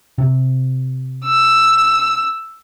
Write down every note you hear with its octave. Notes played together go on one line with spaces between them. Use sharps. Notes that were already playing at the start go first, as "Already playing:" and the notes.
C3
E6